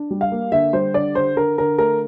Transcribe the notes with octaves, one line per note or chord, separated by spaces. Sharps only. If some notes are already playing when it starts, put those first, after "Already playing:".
Already playing: D4
G3
F5
A#3
D3 E5
G3 C5
D3 D5
D3 C5
D3 A#4
D3 A#4
A3 A#4